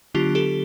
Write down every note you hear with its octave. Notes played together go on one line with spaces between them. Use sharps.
D3 F#3 B3 D4 F4 G4
G4 A4